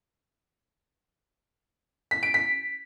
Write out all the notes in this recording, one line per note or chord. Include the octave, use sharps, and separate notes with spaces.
B6
D7
B6